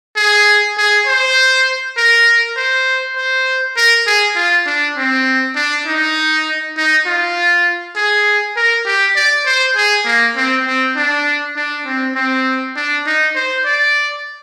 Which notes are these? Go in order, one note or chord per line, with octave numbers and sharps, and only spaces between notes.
G#4
G#4
C5
A#4
C5
C5
A#4
G#4
F4
D4
C4
D4
D#4
D#4
F4
G#4
A#4
G4
D5
C5
G#4
A#3
C4
C4
D4
D4
C4
C4
D4
D#4
C5
D5